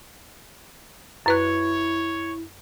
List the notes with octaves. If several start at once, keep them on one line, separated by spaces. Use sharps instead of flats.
F#2 E4 B4 C#5 F#6